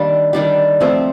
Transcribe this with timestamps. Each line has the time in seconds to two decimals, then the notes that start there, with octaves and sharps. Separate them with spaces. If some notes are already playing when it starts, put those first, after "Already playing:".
Already playing: D#3 G3 A#3 D4 G4
0.33 D#3 G3 D4 G4
0.80 F3 A3 C4